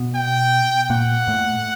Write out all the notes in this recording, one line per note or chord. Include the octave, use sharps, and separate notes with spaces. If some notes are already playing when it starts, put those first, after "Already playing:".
Already playing: B2 B3
G5
A#2 A#3 F#5
A2 A3